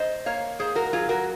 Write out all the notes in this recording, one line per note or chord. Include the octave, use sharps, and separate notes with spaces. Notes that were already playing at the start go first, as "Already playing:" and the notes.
Already playing: G#2 C5 D#5
A#3 C#5 F5
G#2 G#4 C5
F#4 A#4
F#3 F4 G#4
F#4 A#4